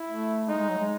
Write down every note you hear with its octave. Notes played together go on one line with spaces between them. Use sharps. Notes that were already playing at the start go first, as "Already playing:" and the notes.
Already playing: E4
A3
G#3 D#4
G#3
F#3
G#3